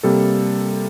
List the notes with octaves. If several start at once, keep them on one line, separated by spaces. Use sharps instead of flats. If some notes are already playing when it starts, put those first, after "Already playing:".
C3 G3 A#3 A4